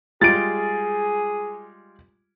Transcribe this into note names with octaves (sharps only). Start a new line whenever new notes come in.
G3 G#3 F4 G#4 A6 D7